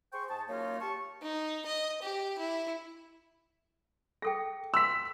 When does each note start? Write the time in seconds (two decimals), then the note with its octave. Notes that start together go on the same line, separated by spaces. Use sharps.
0.13 G#4 C5 G5 C6 C#6
0.30 G#2 G#4 A5
0.49 F#2 A#3 D#4 F4 C#5
0.81 G4 A5 C#6
1.22 D#4
1.66 D#5
2.02 G4
2.38 E4
4.22 G#4 A4 G5 A#6
4.74 C6 E6 B6